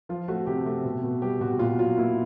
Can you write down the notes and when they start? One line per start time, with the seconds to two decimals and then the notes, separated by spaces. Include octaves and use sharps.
0.09 F3 F4
0.28 A3 F#4
0.47 C3 G4
0.66 A3
0.84 B2
1.03 B2
1.21 G3 G4
1.41 B2 F#4
1.59 A#2 F4
1.78 F#3 F4
1.98 A#3 E4